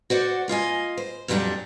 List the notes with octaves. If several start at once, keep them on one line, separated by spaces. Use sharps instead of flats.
F#4 C5 D5 F#5
A#3 F4 D#5 G#5
C5
F2 A#2 F#3 G3 D4 A#5